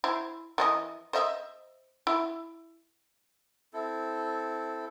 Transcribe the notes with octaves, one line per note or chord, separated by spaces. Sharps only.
E4 C5
E3 G#4 D#5
C5 D#5 E5
E4
C4 E4 A4